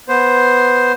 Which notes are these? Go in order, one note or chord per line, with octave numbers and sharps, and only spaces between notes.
B3 C5